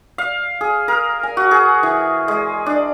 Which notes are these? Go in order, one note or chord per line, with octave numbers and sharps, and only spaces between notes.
F5
G#4
A#4
G#5
F#4
G#4
E3
G#3
D4